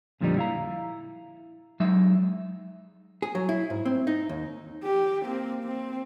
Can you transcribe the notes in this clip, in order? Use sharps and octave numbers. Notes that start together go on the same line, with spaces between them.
F2 A#2 D3 F3 G3 D#4
E4 F5 A#5
F#3 G#3 D#4 E5
G#4
F#3
E4
G#2
C4
D#4
D#2
G4
A#3 C4
C4